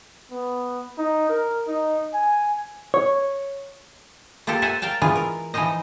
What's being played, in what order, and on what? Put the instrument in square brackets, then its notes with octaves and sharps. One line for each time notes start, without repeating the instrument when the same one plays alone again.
[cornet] B3
D#4
A#4
D#4
G#5
[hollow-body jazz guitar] C#5
[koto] A#3 F4 G4 A4 C5 A5
C5 E5 F#5 G#5 A5
A#4 F5 G5 A5
E3 G#3 A3 B3 F4
A#4
E3 F3 D#4 C5 D#5